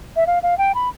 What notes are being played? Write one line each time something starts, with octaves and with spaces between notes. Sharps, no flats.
E5
F5
F5
G5
B5